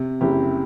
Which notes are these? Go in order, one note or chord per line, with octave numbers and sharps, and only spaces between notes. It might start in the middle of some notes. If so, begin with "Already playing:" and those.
Already playing: C3
F#1 E4 G4